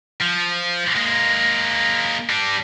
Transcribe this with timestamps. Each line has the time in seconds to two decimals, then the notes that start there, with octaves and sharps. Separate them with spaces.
0.21 F3
0.95 G#3 A#3
2.29 G3 D4